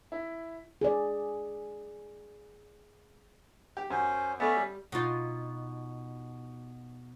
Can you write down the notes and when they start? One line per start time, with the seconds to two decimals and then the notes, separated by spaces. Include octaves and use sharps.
0.12 E4
0.81 G#4 D5
3.77 G4
3.90 F#2 C#4 C5
4.40 A3 B3 C#4 D5 E5
4.56 G3
4.92 B2 D#4 F4